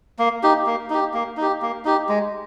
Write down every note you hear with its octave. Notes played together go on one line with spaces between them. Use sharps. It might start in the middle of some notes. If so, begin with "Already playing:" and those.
A#3
D#4 G4
A#3
D#4 G4
A#3
D#4 G4
A#3
D#4 G4
G#3